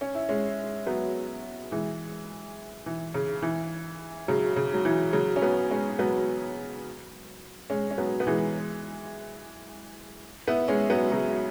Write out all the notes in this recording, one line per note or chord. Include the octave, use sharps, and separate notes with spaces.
C#4
E4
G#3 C#4
F#3 B3
E3 G#3
E3
C#3
E3
C#3 F#3
C#3
F#3
E3
C#3 F#3
C#4
F#3 B3
G#3 C#4
F#3 B3
G#3 C#4
C#4
F#3 B3
B3
E3 G#3
B3 E4
G#3 C#4
F#3 B3
C#3 F#3